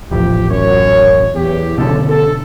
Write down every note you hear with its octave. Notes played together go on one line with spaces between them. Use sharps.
D#1 A1 C3 F3 G4
F#2 C#5
E2 G4
F#1 B1 B2 D3 A4
A4